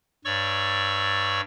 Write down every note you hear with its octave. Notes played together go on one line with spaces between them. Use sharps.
G2 C#5 D5 C#6 E6